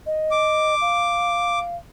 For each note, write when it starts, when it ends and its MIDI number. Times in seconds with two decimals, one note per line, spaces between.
0.06 0.75 75
0.31 1.59 86
0.81 1.76 77